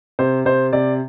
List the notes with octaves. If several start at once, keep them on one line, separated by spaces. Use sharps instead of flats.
C3 C5
C3 C5
C3 D5